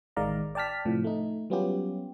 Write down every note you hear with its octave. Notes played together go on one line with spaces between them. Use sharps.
A1 D#3 G#3 D5 F5 A#5
D5 G5 A5 F6 B6
A2 C3 F3
A3 D#4
F#3 G3 B3 C#4 F4 G4